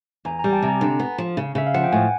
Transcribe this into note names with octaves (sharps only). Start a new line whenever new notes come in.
E2 G#5 A#5
G3 G#5 A#5
G5 A5
C3
G#5 A#5
D3
B3
F3
C#3
C#3 E5
F5
F3 F#5
G5
A2 F#5 G#5